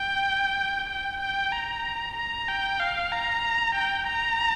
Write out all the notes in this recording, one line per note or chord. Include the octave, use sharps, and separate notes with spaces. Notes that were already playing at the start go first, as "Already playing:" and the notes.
Already playing: G5
G5
G5
A#5
A#5
G5
F5
A#5
G5
A#5